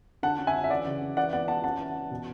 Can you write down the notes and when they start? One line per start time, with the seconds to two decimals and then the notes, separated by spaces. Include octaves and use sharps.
0.23 D3 F#5 A5
0.38 C#4
0.47 E5 G#5
0.54 C#4
0.64 E5
0.70 E3 D5 F#5
0.86 C#3
1.02 C#3
1.17 E3 D5 F#5
1.33 B3 D5 F#5
1.48 B3 F#5 A5
1.64 C#4 F#5 A5
1.80 E3
1.95 E3
2.11 B2